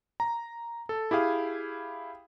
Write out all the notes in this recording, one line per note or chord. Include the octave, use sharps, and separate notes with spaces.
A#5
A4
E4 G4 G#4 F5 D#6